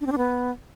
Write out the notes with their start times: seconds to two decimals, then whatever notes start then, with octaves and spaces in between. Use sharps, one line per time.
0.01 D4
0.06 C4
0.12 D4
0.18 B3